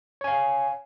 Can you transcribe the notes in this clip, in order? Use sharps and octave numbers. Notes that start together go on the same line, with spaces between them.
C#5 F5 G#5